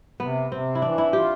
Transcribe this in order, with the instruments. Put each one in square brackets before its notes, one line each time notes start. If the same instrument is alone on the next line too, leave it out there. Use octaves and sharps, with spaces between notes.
[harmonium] C3 [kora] B3
[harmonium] C3 [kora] C4
[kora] E4
[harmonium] E3 [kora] D4
[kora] E4
[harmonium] F4 [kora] G4